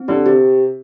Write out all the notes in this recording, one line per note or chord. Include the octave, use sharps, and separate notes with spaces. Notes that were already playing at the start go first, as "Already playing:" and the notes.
Already playing: C4
D3 G4
C3 G4